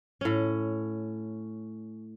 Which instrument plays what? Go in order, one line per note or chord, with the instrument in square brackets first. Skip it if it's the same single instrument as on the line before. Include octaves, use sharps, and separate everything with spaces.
[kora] A2 C#4